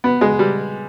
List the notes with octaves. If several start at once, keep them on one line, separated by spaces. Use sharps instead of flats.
B3
G#3
G3